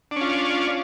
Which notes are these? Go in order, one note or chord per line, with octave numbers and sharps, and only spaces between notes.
C#4 D4 F4